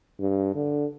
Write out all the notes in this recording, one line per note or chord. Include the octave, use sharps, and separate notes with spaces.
G2
D3